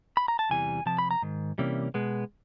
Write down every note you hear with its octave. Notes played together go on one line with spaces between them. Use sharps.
B5
A#5
A5
E2 C3 E3 G3 G#5
C3 F3 A5
B5
A#5
G#2 D#3
C3 E3 G3 A#3 C#4
B2 G#3 B3